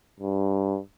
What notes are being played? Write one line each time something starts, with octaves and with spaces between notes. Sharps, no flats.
G2